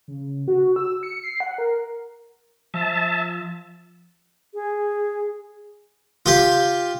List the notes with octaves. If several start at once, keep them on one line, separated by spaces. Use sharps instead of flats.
C#3
F#4
E6
C#7
C7
F#5
A#4
F3 E5 A5
G#4
F4 G4